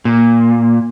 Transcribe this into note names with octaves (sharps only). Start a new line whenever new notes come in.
A#2